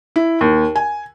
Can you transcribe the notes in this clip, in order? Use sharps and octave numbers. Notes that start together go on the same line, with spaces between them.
E4
D#2
G#5